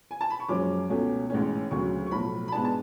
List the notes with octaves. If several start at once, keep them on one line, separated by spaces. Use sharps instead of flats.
G#5
A5
B5
C#6
F#1 F#2 F3 G#3 C#4 D6
C#2 B2 A3 C#4
A1 G#2 G#3 C#4
D2 C#3 F#3 C#6
C#6
B1 A2 F3 B5
B5
G#2 G#3 B3 D4 A5
A5